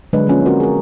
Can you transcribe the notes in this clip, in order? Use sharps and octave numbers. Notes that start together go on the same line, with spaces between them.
D3 F#3 G#3 D4 B4
F3 A#3 C#4 F4
C4 C#4 F#4 A#4 C5
G#4 A#4